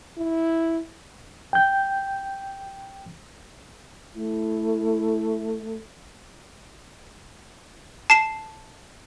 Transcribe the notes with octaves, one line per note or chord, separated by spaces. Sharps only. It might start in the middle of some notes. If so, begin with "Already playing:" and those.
E4
G5 G6
A3 E4
A5 C7 E7